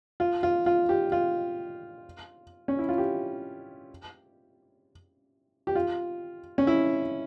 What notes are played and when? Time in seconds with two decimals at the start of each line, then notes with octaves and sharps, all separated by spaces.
0.20 F4
0.43 F4
0.66 F4
0.89 G4
1.12 F4
2.68 C#4
2.79 E4
2.89 F4
2.98 G4
5.67 G4
5.75 F4
6.58 C#4
6.67 E4